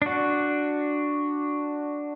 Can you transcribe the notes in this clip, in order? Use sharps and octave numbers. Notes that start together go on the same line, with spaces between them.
D4 F#4